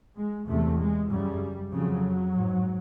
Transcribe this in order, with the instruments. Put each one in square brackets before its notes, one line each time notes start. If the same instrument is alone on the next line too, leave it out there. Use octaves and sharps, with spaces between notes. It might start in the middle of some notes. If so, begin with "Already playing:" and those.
[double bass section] G#3
E2 C3 A3
G#3
F#2 C#3 G3
F2 C#3 F#3
G#2